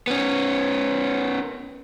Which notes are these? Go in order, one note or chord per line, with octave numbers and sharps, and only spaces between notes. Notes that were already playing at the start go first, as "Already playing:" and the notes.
B3 C#4